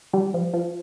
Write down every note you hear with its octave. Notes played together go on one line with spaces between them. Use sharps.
G3
F3
F3